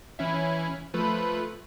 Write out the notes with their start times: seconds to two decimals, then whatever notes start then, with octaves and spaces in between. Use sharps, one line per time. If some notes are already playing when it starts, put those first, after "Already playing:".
0.19 E3 C#4 E4
0.94 F3 A3 B4